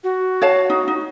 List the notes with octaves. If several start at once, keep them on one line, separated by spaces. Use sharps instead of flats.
F#4
C#5 F5 A5
D#4
D#4